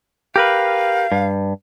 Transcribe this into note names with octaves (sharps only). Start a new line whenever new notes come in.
G4 A#4 B4 F5
G2